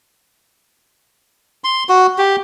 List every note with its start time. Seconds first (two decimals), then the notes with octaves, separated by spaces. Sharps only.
1.64 C6
1.89 F#4
2.18 G4